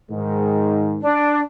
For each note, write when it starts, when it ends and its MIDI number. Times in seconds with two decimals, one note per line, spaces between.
0.11 1.04 44
0.11 1.04 51
1.01 1.40 62